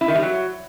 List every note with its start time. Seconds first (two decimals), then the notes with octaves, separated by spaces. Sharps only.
0.01 E4
0.08 D#3
0.15 G3
0.23 F#3